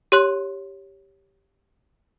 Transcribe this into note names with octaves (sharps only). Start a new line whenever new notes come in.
G4 C#5 C6 F#6